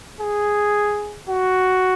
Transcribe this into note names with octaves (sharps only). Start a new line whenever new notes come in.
G#4
F#4